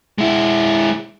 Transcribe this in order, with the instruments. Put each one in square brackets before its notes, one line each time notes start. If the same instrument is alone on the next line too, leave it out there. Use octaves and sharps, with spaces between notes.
[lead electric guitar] G#3 E4